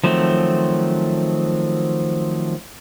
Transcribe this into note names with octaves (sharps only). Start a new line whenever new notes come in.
D#3 F3 F#3 A3 C4